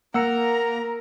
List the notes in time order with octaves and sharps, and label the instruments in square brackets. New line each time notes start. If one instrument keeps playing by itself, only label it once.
[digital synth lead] A#3 [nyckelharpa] A#4 [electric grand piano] F#5 E6 C#7 [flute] A#5